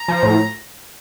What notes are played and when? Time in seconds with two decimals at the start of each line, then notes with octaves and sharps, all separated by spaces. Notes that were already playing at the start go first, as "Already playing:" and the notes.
Already playing: A#5
0.08 F3
0.23 A2